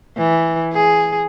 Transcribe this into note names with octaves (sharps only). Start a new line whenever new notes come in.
E3
G#4